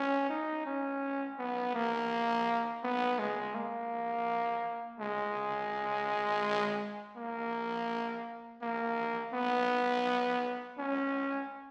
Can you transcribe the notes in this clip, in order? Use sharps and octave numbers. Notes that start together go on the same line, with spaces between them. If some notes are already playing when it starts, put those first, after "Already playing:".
Already playing: C#4
D#4
C#4
B3
A#3
B3
G#3
A#3
G#3
A#3
A#3
B3
C#4